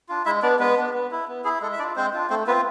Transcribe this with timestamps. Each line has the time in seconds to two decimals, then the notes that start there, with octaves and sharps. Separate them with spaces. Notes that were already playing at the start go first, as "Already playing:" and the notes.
0.09 D4 F4
0.26 G#3 E4 E5
0.43 B3 D4 D5
0.59 G#3 B3 B4
0.77 B3 D4
0.94 B3
1.11 E4
1.28 B3
1.44 E4 G#4
1.61 G#3 A4
1.72 E5
1.79 D4 D5
1.83 F4
1.96 G#3 C4 C5
2.14 D4 F4
2.30 A3 C4 C5
2.47 B3 C4 F4 B4